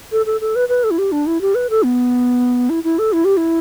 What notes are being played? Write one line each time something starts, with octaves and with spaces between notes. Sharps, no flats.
A4
A4
A4
B4
B4
A4
E4
G4
D4
E4
G4
B4
A4
B3
E4
E4
A4
E4
G4
E4